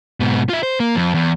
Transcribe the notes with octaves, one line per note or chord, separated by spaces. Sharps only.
G#2 B2
F4 E5
C5
A#3
F2
E2